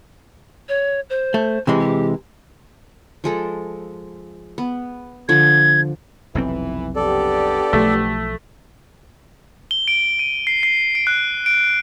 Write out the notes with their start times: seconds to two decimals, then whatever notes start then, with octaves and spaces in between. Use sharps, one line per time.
0.69 C#5
1.10 C5
1.34 A3
1.67 C3 E3 G#3
1.80 G4
3.24 F3 G#3 A4
4.58 B3
5.29 D3 F3 G#6
6.35 F1 B1 E3 C4
6.96 B3 D4 G4 A4 D5
7.73 B1 F3 A3
9.71 G7
9.88 D7
10.19 D#7
10.47 C7
10.63 C7
10.95 D7
11.07 F#6
11.46 D7